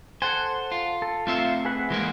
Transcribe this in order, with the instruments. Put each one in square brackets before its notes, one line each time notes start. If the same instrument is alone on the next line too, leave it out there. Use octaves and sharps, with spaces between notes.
[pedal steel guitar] A4 F#5 G#5 [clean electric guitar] C5
[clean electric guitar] F4
[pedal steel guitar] A4
[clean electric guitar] A3 C4 E5 [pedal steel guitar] F4 C5
[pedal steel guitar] G#4 B4 F#5
[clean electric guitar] E3 G#3 A#3